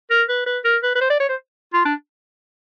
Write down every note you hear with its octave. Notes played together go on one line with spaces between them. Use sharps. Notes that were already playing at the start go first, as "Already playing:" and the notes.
A#4
B4
B4
A#4
B4
B4
C5
D5
C#5
C5
F4
D4